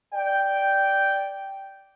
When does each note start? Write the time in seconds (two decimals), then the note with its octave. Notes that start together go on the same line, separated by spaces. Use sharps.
0.14 D5 G5